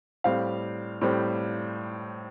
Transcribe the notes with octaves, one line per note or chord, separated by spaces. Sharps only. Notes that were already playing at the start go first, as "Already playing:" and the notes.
A2 G3 C4 F5
A2 G3 C4